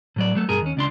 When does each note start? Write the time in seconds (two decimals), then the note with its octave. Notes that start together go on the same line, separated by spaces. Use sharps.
0.16 A2 F#3 D5
0.35 F#3 A3 A4
0.49 B1 G2 G#4 A#4
0.62 D#2 C#4
0.77 C#2 D4 C6